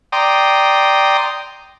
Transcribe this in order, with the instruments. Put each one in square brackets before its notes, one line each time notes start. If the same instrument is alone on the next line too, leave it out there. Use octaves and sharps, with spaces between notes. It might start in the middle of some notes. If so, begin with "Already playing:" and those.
[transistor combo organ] D5 G5 A#5 C6 D#6